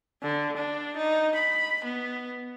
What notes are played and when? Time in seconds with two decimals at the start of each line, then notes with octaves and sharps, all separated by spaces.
0.23 D3
0.57 D4
0.97 D#4
1.36 B5
1.85 B3